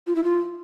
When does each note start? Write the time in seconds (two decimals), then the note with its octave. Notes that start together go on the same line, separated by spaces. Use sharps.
0.07 F4
0.15 E4
0.24 F4